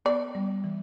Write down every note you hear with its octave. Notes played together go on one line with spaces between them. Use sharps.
B3 D5
G3
E3